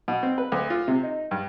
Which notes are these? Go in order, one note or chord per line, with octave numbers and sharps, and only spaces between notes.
B2
C4
B4
D2
F4
C3
D#4
G2